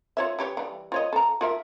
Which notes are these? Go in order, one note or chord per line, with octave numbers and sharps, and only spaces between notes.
F4 C#5 E5
E3 G4 C#5
E3 G3
F4 C#5 D#5
A4 A#5
F4 A#4 E5